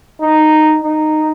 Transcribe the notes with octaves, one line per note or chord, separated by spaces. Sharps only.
D#4
D#4